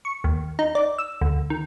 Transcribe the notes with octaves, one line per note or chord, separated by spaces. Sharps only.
C#6
D#2
D#4
D5
E6
D2
D#3